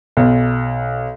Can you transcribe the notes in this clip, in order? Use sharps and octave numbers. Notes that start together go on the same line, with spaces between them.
B1